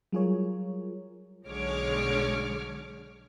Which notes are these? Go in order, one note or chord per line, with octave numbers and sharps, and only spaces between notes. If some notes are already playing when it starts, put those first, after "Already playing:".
F#3 G3 F4 G#4 A#4 C#5
B1 D3 G#3 C#5 D6 F6